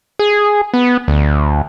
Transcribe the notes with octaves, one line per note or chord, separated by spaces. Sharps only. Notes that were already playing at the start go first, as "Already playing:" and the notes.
G#4
B3
D2